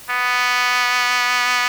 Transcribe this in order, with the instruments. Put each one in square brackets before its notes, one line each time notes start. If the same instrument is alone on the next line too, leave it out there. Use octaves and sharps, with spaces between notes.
[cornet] B3